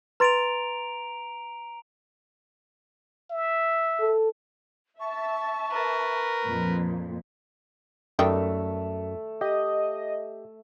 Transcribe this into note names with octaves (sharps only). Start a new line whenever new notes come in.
B4 A#5 C6 A6 D7 F7
E5
A4
E5 A5 C#6
A#4 B4
F2 A#2
F#2 D#3 G3 A3 G5
G4 D#5